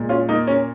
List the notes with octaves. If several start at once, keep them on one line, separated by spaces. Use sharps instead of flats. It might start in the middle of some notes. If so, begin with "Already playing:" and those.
Already playing: A#2 G#3
C#4 F4
A#3 D#4
C#4